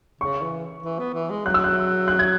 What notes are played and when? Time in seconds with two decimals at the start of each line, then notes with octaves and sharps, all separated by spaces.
0.21 C#3 C#6
0.42 E3
0.82 E3
0.99 B3
1.14 E3
1.30 G#3
1.45 F#3 F#6
1.54 E6
1.64 F#6
2.08 F#6
2.19 G#6